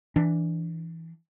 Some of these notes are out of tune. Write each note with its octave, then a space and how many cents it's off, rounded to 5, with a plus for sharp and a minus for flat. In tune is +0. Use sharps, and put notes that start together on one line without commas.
E3 +0 D4 +0